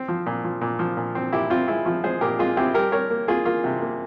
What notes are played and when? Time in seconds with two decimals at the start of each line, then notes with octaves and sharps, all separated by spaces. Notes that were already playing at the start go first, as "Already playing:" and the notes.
Already playing: C4
0.08 F3
0.26 A#2
0.44 F3
0.61 A#2
0.79 F3
0.97 A#2
1.15 C4
1.33 A#2 E4 G4
1.50 C4 F4
1.68 G#3 E4
1.85 F3 F4
2.04 G#3 G#4 C5
2.21 A#2 G4 A#4
2.39 G#3 F4 G#4
2.57 C4 E4 G4
2.74 G3 G4 A#4
2.92 G3 A#4 C#5
3.10 A#3
3.28 A#3 F4 G#4
3.45 A#3 F4
3.64 C3
3.81 A#3